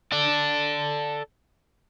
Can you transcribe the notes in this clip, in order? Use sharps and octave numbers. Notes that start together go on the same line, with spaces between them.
A4 D5